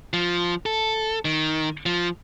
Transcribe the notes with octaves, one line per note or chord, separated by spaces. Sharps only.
F3
A4
D#3
F3